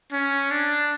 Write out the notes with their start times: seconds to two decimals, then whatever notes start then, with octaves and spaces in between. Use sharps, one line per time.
0.12 C#4
0.51 D4